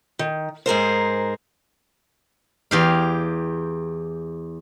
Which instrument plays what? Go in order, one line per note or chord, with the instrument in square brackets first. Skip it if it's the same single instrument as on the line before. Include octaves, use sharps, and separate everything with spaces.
[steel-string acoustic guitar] D#3
G#2 G#4 A#4 C5
[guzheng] E2 G4 F5